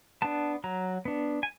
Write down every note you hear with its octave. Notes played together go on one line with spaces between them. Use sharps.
B3 D4 A5
F#3 A#5
B3 D4
G#5